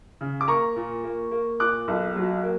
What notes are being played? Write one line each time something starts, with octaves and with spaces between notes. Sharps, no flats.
C#3
D6
A#3 A#5 C#6
A#2
A#3
A#3
A#2 D6 F#6
B1
F#3
A#3